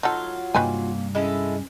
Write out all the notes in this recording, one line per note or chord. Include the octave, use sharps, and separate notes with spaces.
F#3 D#4 F4 A4
G2 C3 D#3 G3 A#3 B4 G#5
G#3 C#4 E4 A4